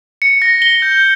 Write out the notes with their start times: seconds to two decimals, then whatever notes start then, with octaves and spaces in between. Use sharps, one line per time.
0.22 C#7
0.42 A#6
0.62 G7
0.82 G6